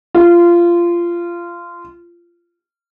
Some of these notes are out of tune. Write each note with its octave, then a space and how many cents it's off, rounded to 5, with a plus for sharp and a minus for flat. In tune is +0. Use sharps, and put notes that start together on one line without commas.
F4 -20